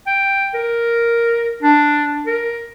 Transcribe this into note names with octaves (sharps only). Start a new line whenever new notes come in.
G5
A#4
D4
A#4